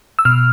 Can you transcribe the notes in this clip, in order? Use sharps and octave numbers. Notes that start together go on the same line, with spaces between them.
E6
B2 F6